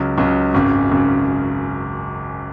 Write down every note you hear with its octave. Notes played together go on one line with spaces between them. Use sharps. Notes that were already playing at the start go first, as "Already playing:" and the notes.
Already playing: C#2 C#3 F#3
C#2 C#3 F#3
G#1 F#2 C#3
G#1 F#2 C#3